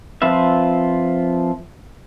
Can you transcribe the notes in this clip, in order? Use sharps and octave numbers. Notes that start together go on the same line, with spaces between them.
F3 C4 F4 B4 E5